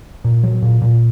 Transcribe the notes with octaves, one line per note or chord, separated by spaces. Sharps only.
A#2
F#3
A#2
A#2